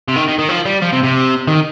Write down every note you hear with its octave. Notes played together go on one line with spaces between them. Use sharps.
C3
D#3
D#3
D#3
F3
G3
F3
C3
C3
D#3